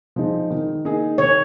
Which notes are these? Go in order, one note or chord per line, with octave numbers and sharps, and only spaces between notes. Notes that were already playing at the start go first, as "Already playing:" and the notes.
F3 G#3 D#4
D#3
A#3 D#4 G#4
D#3 C#5